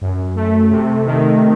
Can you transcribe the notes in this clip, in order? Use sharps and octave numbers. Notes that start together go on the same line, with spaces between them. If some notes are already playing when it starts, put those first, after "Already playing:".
F#2
A3
C3
D#3